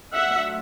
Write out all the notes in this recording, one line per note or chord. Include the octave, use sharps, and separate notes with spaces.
F#3 A3 D4 F4 E5 F#5